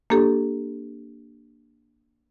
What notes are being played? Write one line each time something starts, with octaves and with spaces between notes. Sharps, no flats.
A#3 D4 G4 A4